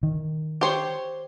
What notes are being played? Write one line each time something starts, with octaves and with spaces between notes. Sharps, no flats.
D#3
G4 C5 C#5